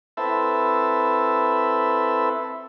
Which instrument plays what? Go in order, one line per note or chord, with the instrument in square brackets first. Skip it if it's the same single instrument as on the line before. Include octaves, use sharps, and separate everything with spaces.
[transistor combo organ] C4 E4 A4 B4 E5